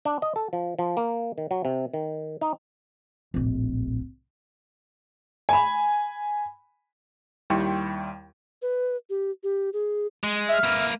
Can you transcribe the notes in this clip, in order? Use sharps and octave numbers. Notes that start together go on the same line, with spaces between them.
D4
D#5
A4
F3
F3
A#3
D#3
F#3
C3
D#3
D#4
D1 A#1
G#5 B5
D#2 G3 E4 G5 C6 C#6
B4
G4
G4
G#4
G#3
E5 F6
A#3 B4